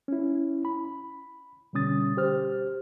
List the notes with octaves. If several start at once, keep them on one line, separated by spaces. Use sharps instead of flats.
C#4 E4
B5
B2 D3 G3 C#4 D#6 A6
G4 C5 F6